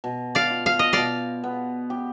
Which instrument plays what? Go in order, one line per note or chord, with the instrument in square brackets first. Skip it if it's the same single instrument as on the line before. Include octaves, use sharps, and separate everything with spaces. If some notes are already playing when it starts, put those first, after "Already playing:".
[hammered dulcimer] B2
[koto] D5 F5
[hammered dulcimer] F4
[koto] F5
D#5
[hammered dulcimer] B2 [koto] D5 F5
[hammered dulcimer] B3
G4